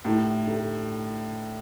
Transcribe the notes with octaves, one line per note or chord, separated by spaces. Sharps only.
A2 D3 A3 D#4 G4
D3 A3 D#4 G4